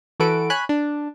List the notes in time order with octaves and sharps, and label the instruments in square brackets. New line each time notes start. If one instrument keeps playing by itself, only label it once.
[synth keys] E3 F#4 A4 B4 D7
C#5 G#5 B5 F#6
D4